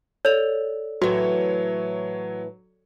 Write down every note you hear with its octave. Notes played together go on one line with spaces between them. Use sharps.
A4 C#5 D5 F7
A2 E3 F#3 F#4 C#5